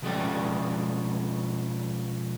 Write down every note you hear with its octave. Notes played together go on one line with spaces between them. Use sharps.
B2 F3 G#3 C#4 D5 G5